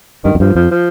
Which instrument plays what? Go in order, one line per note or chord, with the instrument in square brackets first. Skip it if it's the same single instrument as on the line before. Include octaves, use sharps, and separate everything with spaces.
[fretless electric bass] G2 [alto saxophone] D#3
[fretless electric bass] F2
[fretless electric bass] G2 [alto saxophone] F3
[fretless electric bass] F2 [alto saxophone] F3
[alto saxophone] F3